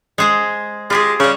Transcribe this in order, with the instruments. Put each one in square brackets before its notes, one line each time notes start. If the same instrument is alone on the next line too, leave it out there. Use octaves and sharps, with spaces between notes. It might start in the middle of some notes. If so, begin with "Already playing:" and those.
[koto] G#3 G#4 C5
[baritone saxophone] G#3 [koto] F4 G4 G#4
[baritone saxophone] C#3 [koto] G3 C#5